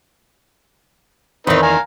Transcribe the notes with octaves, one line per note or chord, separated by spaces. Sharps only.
E2 D#3 C4 D#4 B4
F5 G#5 A#5